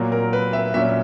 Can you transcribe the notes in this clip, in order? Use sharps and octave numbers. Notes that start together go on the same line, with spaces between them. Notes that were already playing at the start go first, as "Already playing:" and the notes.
Already playing: A#2 F#3 A#3
A#4
B4
E5
A#2 F#3 C#4 E5